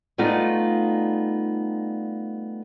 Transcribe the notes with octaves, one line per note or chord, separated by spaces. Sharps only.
G3 A3 B3 D#4 F4